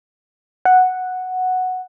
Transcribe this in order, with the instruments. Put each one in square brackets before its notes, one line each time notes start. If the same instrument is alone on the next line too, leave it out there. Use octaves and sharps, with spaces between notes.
[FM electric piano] F#5